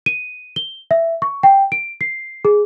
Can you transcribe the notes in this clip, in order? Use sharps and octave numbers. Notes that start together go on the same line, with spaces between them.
D#7
G7
E5
C#6
G5
D7
C7
G#4